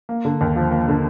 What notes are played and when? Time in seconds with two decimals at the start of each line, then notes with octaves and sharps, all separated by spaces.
0.09 A#3
0.25 D3
0.41 D#2
0.56 F3
0.71 A#3
0.88 D3